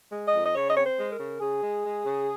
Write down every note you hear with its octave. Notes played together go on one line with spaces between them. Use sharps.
G#3
D#5
F2
D#5
C#3 C#5
D#5
C4 C#5
C5
G#3
A#4
C#3
C#3 G#4
G#3
G#3
C#3